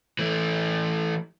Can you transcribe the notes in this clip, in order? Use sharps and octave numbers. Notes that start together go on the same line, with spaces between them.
E3 A3